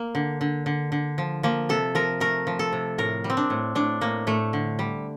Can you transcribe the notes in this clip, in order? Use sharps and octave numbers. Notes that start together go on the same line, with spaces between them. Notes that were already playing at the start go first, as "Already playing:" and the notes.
Already playing: A#3
D3
D3
D3
D3
F3
F3 A#3
C3 A4
F3 A#4
A3 A#4
F3
A4
C3
A2 A#4
G3
C4
D4
A2
A2 D4
A2 A#3
A2 A3
D3
G3